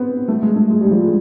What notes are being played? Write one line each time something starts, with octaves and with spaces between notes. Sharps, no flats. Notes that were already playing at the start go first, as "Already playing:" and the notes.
Already playing: B3 C4
A3
G#3
A3
G#3
G3
F3
G#3